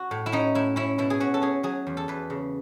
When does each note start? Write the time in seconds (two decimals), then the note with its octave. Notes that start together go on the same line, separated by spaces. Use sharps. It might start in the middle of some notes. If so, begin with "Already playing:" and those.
Already playing: F#4
0.11 A2
0.26 E4
0.32 C#4 D#4
0.55 A2 E4
0.76 C#4 E4
0.98 B2 E4
1.10 G#4
1.20 C#4 F#4
1.34 A4
1.42 C#4 G#4
1.63 F#3 G#4
1.87 E2
1.97 A4
2.08 E2 B4
2.30 C#3